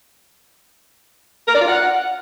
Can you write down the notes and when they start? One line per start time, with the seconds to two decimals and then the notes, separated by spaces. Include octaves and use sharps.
1.48 A#4
1.55 D5
1.62 F4
1.68 F#5